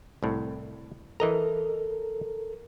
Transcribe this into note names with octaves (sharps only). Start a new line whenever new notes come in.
C2 A2
E3 A4 A#4 D#5 A#5